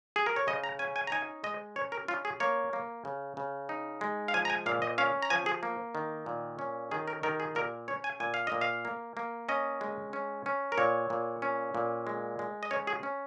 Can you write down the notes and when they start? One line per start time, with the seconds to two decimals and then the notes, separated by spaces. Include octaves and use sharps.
0.16 G#4
0.26 A#4
0.36 C#5
0.47 C#3 D#5
0.64 A#5
0.79 C#4 G#5
0.96 G#5
1.07 A#5
1.12 D#4 G#5
1.44 G#3 D#5
1.76 C#4 C#5
1.92 A#4
2.08 C#4 F4
2.25 G#4
2.40 A#3 C#5
2.73 A#3
3.05 C#3
3.37 C#3
3.69 D#4
4.01 G#3
4.28 F5
4.34 F3 G#5
4.45 A#5
4.50 G#5
4.66 A#2 F5
4.82 D#5
4.98 C#4 F5
5.22 A#5
5.30 F3 G#5
5.46 G#4
5.63 A#3
5.95 D#3
6.26 A#2
6.59 C#4
6.91 D#3 G#4
7.08 A#4
7.23 D#3 A#4
7.40 G#4
7.55 A#2 A#4
7.88 C#4 C#5
8.04 G#5
8.20 A#2 G#5
8.34 F5
8.47 A#2 D#5
8.61 F5
8.85 A#3
9.17 A#3
9.49 C#4 D#5
9.81 G#3
10.13 C#4
10.46 C#4
10.72 A#4
10.78 A#2 C#5
11.10 A#2
11.42 C#4
11.75 A#2
12.07 G#3
12.39 G#3
12.63 D#5
12.71 C#4 C#5
12.87 G#4
13.03 C#4